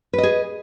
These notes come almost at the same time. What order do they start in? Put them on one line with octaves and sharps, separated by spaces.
B4 D#5 G#4